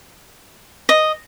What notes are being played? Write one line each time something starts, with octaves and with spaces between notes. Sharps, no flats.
D#5